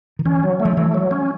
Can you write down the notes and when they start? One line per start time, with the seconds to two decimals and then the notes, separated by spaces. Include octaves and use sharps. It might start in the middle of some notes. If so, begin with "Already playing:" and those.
0.19 D#3
0.25 E3 C#4
0.43 F#3
0.60 A3
0.65 F3
0.77 E3 A3
0.94 F#3
1.11 C#4